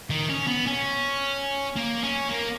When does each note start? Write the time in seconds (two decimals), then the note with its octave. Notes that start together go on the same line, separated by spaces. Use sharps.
0.10 D#3
0.29 C#4
0.47 B3
0.66 C#4
1.77 A#3
2.03 C#4
2.31 A#3